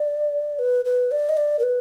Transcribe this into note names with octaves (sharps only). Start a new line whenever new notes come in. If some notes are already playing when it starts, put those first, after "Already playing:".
Already playing: D5
B4
B4
D5
D#5
D5
A#4
B4